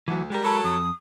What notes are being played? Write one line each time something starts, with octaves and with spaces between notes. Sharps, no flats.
D2 E3 F#3
G3 G#3 A#4
F#3 A4 B5
F2 D#6